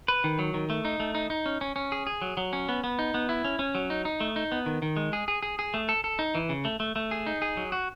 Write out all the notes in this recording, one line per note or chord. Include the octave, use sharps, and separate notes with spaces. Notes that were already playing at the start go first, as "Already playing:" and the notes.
B4
D#3
F#3
D#3
A3
D#4
A3
D#4
D#4
C#4
C#4
C#4
G#4
G#4
F#3
F#3
C#4
B3
B3
D#4
B3
E4
C#4
C#4
F#3
D#4
D#4
A3
D#4
B3
D#3
D#3
G#3
G#4
G#4
G#4
G#4
A3
A4
A4
D#4
E3
C#3
A3
A3
A3
G#4
D#4
G#4
F#3
F#4